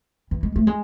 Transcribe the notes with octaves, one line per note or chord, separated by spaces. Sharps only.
E3
G#3
A3
G#3